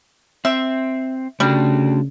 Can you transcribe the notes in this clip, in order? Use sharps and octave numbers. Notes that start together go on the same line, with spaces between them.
C4 E5
C#3 G3 A3 D4 F#4